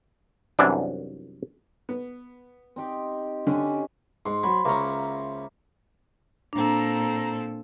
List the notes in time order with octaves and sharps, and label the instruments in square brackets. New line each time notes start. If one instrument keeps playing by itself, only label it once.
[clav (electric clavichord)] C2 F#2 E3 D4
[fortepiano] B3
[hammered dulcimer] C4 D#4 G4
[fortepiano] D3 D4 [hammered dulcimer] C#4 G4 G#5
[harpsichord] G#2 [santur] C6
[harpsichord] F#3 [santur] C5 F#5 B5
[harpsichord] C#2 C#4 [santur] A#3 E5 A#5
[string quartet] A#2 C4 A4 [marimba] D4 [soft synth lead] A#5